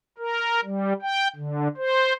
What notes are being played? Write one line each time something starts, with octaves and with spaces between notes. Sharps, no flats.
A#4
G3
G5
D3
C5